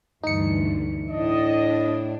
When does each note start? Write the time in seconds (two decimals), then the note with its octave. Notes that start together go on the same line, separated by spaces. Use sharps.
0.23 D2 G2 E3 D#4 C#7
1.10 A2 D4 D#5